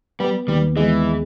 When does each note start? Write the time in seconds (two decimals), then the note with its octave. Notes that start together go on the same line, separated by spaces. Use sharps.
0.20 G3 B3
0.48 D#2 G3
0.76 E3 G#3